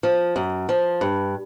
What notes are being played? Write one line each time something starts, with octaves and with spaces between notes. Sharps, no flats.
F3
F#2
F3
G2